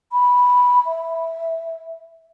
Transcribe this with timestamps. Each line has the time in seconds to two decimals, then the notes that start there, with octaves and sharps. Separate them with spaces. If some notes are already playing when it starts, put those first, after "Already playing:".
0.12 B5
0.86 E5